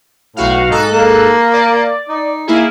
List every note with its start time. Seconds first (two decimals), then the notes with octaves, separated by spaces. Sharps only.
0.36 B1 A2 F#4 F5
0.69 G#2 D#4 A4 F#6
0.92 A#3
1.53 D5
2.09 D#4
2.47 A#3 E4 G#4